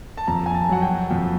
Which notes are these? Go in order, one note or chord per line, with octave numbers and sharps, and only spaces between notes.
A5
F2 A#5
G#5
A5
F#3 F#5
G5
F2